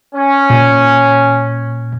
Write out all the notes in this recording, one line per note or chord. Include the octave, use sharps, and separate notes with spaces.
C#4
A#2